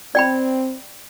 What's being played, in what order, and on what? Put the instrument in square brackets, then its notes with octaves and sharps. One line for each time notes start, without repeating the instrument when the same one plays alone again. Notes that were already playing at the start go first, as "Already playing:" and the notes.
[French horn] C4 [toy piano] D5 G5 B5